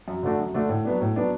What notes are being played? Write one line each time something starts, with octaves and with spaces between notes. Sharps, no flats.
F#2
D3 A3 D4 F#4
F#2
D3 A3 D4 F#4
A2
F#3 B3 D4
A2
F#3 B3 D4